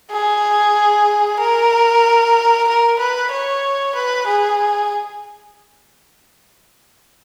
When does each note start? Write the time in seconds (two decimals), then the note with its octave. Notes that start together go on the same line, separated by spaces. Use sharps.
0.12 G#4
1.39 A#4
2.68 A#4
2.99 B4
3.31 C#5
3.95 B4
4.27 G#4